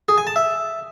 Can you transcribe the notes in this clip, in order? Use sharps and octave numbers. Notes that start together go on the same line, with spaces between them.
G#4
G#5
A5
E5